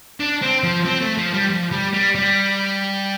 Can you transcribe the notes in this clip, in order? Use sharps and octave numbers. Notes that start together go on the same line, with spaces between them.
D4
C4
F3
C4
A3
F3
G3
F3
G3
G3
G3